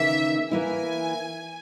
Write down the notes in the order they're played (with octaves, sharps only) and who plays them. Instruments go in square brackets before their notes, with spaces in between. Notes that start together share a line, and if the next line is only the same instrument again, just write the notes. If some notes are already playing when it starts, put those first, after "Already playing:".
Already playing: [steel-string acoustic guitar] D#2 C#3 E3 A#3 D#4 [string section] E5
[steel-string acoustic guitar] E3 A#3 E4 [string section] G#5